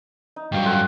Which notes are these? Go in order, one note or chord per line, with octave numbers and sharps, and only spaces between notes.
D#4
G2 F#3 C#5 F5 G5
F4 A4 F#5